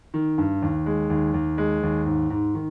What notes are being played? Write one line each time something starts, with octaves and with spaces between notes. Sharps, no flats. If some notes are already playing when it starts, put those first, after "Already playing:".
D#3
G2
D#2
G#3
D#2
D#2
G#3
D#2
G#2
G#2
D#3